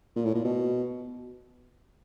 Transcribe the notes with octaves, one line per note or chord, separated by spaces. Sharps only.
A#2
A2
A#2
B2